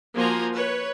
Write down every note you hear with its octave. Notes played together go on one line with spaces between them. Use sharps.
F3 A#3 F#4 G#5 A#5 C6
B4 C#5